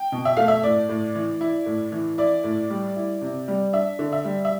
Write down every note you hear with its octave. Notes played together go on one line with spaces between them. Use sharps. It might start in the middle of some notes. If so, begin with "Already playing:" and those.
Already playing: G5
B2
E5
A3 F5
E5
A2 D5
A2
E3
E4
A2
E3
E4 D5
A2
G3
E4
C3
G3
D4 E5
D3
E5
G3
E5